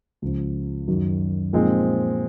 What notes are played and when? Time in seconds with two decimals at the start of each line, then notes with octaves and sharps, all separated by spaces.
0.22 C#2 C#3 F3
0.88 F#2 D#3 F#3
1.53 A#2 F3 G#3 C4 D#4